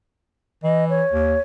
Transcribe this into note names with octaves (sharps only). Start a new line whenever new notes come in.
E3 D#5
C#5
D#2